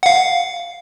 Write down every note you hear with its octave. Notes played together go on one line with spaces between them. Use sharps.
F5 F#5